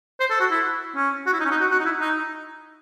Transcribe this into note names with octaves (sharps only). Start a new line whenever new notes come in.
C5
A4
F#4
E4
C#4
F#4
E4
D#4
C#4
D#4
F#4
F#4
D#4
E4
D#4